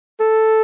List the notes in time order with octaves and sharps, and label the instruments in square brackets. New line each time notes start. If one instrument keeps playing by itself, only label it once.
[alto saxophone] A4